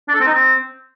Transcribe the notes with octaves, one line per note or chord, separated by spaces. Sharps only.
D4
A4
C4
D#4
C4